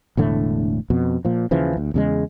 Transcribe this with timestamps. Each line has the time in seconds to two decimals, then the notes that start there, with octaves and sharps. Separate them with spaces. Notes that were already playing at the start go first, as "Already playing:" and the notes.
0.17 E1 A2 D3 A3
0.90 F2 B2
1.25 A#2 F3
1.51 D#2 C#3 E3 F3
1.77 D2
1.94 E2 C#3 G#3